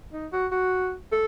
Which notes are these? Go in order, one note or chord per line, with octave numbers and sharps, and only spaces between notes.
D#4
F#4
F#4
A4